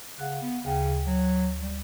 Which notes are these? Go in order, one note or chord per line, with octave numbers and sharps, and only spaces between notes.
C#3 F5 F#5 F#6
B3
D2 C#3 G5
F#3
G3